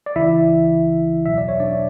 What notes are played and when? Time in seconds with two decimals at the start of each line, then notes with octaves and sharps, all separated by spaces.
0.06 D5
0.15 C#2 C#3 E3 E4 E5
1.25 E2 B2 F#3 E5
1.38 D5
1.48 C#5
1.60 D4 D5